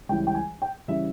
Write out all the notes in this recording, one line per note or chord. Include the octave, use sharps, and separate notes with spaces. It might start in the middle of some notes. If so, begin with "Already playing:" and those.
C#2 C#3 E3 G3 C#4 G5
G5
G#5
G5
C#3 E3 G3 C#4 E5